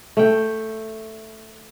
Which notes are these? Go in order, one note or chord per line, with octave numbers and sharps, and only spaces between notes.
A3 G5